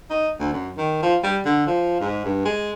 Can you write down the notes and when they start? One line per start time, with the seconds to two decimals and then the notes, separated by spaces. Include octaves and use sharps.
0.10 D#4
0.40 D2
0.53 F#2
0.78 D#3
1.03 F3
1.24 G3
1.45 D3
1.67 F3
2.00 G#2
2.25 G2
2.45 G#3